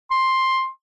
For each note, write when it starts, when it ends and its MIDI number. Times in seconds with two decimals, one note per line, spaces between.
0.11 0.69 84